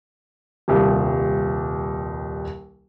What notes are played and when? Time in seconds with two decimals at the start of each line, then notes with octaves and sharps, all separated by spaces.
0.68 D#1 C2